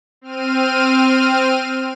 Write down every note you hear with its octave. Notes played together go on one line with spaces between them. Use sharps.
C4 F6 D#7